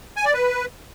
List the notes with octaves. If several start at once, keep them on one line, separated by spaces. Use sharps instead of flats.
G#5
D5
B4